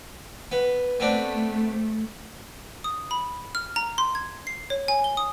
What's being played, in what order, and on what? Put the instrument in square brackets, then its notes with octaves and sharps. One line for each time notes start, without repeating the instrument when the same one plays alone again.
[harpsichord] B3
[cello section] A3 [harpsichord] B3 C4 D4
[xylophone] D#6
B5
F6
A#5
C6
G#6
C7
C#5
G#5
G7
D#6